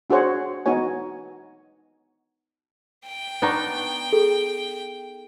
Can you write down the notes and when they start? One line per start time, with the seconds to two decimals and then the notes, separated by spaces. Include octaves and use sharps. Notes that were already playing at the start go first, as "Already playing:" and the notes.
0.10 D4 F#4 G#4 C5 C#5 F#5
0.66 B3 D#4 F#4 C#5 G#5
3.06 G5
3.42 B3 D4 D#4 B4 C#6
4.12 G#4 A4